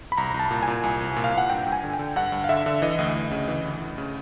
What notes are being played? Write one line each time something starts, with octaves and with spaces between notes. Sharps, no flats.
B5
C2 A#5
C2
A5
A#2
A#2 G#5
C2
C2
A#2
F5
A#2 F#5
G2 G5
G2
G#5
D3
G5
D3
G2 F#5
G2
F5
D3 E5
D3
E3 D#5
D2
D2
C#3
E3
D2
D2
C#3